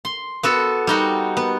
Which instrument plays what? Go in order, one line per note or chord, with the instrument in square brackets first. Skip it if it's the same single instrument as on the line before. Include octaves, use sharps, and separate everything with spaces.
[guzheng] C6
B3 F#4 A4 B5
G3 D#4 F#4
B3